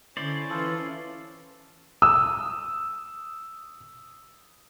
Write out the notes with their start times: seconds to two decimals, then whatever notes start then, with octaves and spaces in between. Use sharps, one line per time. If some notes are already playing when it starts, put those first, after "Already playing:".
0.17 D3 C#4 E4 C5 D5
0.50 E3 F4 A4
2.02 D#6 E6